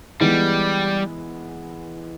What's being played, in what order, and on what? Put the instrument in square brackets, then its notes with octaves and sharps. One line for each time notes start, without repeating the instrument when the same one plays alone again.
[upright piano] E3 G#3 B3 [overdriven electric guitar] G3